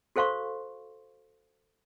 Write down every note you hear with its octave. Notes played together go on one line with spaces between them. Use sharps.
F#4 A4 C5 F5 C6 C#6